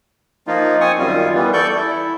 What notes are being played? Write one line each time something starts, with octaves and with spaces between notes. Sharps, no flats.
F3 A#3 D#4 F4
C4 G#5 C#6 D#6
F#2 D#3 G3 F4
E3 G3 B3
A4 D5 C#6 G6
E4